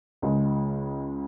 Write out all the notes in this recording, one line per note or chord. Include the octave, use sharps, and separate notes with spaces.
C#2 C#3 G#3